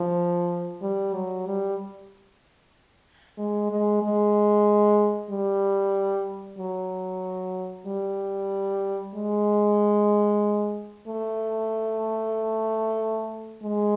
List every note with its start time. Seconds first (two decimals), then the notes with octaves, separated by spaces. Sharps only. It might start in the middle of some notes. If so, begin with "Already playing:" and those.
Already playing: F3
0.82 G3
1.14 F#3
1.46 G3
3.38 G#3
3.71 G#3
4.03 G#3
5.30 G3
6.59 F#3
7.86 G3
9.15 G#3
11.07 A3
13.63 G#3